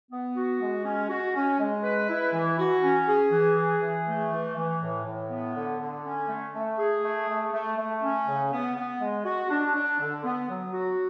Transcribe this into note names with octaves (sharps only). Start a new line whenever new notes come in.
B3
F#4
G#3
C#4
F#4
C#4
G#3
B4
E4
E3
F#4
C#4
G#4
E3
G#4
E3
A3
E3
E3
A2
A2
B3
D3
D3
C#4
A3
A3
G#4
A3
A3
A3
A3
C#4
C#3
B3
B3
G#3
F#4
D4
D4
D3
B3
F#3
F#4